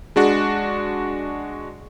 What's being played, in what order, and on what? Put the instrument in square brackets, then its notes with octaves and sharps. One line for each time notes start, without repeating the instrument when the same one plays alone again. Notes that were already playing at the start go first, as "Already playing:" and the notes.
[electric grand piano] G#3 D4 F#4 [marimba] G#4